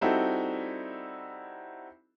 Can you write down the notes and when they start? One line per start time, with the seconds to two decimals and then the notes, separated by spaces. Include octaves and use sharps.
0.01 G3 C4 D#4 E4 F#4 A4